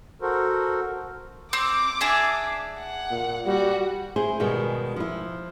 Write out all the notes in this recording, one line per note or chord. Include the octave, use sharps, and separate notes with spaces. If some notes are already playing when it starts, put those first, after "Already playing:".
F#4 A4 A#4 C5
C4 D6
D4 G#4 E5
F#5
A#2
G3 F#4
E4 G#4 C5
G#2 B2 D#3 G3 G#3
F3 E4